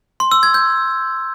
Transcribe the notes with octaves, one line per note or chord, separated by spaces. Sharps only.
C6
E6
G#6
G6